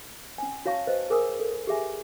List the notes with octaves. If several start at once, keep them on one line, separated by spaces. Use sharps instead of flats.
C#4 G#5
F#4 C#5 F5 A5 C#6
B4 C5 D#5
G#4 A#4 G#5 D#6 E6
A4
G4 G#4 E5 G#5